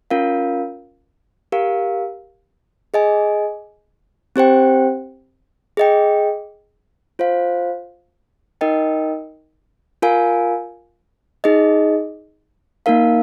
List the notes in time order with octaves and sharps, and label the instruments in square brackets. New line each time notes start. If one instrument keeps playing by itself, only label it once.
[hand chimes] C#4 F4 A#4 F5
G4 A#4 F5
G#4 D#5 G#5
C4 G4 C5 G5
G#4 D#5 G5
F4 C5 F5
D#4 A#4 D#5 G5
F4 A#4 F5 G#5
D#4 G#4 D#5
A#3 D#4 A#4 F5